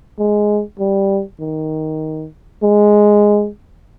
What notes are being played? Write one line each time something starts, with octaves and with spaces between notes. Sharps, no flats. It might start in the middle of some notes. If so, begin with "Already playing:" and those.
G#3
G3
D#3
G#3